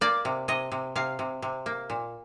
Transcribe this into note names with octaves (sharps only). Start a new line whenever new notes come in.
A#3 D5
C3
C3 D#5
C3
C3 F5
C3
C3
A#3
A#2